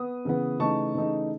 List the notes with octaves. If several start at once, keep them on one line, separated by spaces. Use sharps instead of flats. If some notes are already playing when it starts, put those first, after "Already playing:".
Already playing: B3 D#6
C#3 E3 B3
C#3 E3 A3 D#4 A5 C#6
C#3 E3 A3 D#4